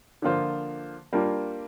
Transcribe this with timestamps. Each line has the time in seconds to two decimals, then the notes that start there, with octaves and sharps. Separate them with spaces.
0.22 D3 F3 A#3 F4 C5
1.13 G3 A#3 D4 F4